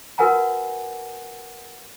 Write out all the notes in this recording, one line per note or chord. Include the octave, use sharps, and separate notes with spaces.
F#4 A#4 B4 F#5 G#5 A#5